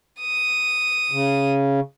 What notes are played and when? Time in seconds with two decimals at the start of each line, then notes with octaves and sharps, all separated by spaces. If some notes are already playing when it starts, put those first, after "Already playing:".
0.20 D#6
1.12 C#3